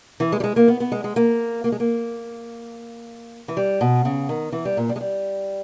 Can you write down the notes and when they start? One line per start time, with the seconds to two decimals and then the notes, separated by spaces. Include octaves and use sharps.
0.20 E3
0.32 G#3
0.40 G3
0.44 G#3
0.56 A#3
0.68 B3
0.80 B3
0.92 G#3
1.04 G#3
1.16 A#3
1.64 A#3
1.72 G#3
1.80 A#3
3.48 E3
3.57 G3
3.81 B2
4.05 C#3
4.29 D#3
4.52 E3
4.65 G3
4.77 A#2
4.89 G3
4.96 G#3
5.01 G3